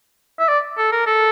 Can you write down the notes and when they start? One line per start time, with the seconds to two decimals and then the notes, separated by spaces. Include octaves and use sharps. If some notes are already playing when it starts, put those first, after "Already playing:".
0.39 E5
0.48 D5
0.77 A4
0.92 A#4
1.06 A4